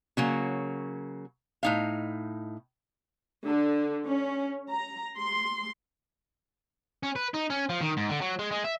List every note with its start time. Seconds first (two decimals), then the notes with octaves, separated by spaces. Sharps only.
0.17 C#3 F#3 A#3
1.63 A2 D#4 F5
3.45 D3
4.06 C#4
4.68 A#5
5.17 C6
7.03 C#4
7.16 B4
7.34 D#4
7.50 C#4
7.69 F3
7.81 D#3
7.97 G#2
8.09 D3
8.21 F#3
8.39 G#3
8.51 G#3
8.64 E5